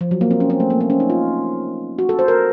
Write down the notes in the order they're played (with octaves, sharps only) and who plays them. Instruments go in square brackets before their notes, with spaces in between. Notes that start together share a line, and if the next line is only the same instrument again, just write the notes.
[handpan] F3
F#3
A#3
C4
C#4
C4
A3
A#3
C4
C#4
D#4
F4
F#4
A4
C5
A#4